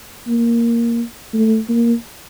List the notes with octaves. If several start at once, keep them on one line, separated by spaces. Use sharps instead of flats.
A#3
A3
A#3